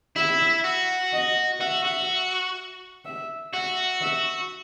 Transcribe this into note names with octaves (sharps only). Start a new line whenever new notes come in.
E4 E5
F#4
D#5
F#4 E5
F#4
E5
F#4 E5
E5